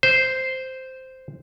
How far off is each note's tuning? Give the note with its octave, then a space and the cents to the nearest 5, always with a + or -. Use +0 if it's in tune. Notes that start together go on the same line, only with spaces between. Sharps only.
C5 -5